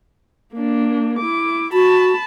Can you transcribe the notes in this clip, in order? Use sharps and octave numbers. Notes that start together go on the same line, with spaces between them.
A#3 D4
E4 D6
F#4 A5 B5